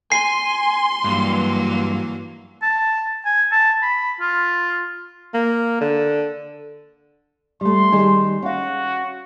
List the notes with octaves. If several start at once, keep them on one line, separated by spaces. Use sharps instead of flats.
G#5 C6 C7
G2 E3 F#3 A#3
A5
G#5
A5
B5
F4
A#3
D3
G3 A3 C6
D#3 G3 G#4
C#4 F#4 F5